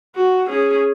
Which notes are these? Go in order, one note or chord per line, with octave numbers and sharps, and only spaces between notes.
F#4
C#4 G#4